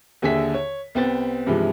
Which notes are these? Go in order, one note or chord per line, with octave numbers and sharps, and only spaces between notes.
D#2 D3 G#4 E5 B6
C#5
C2 B3 C4 A6
G2 C3 E3 F3 G#3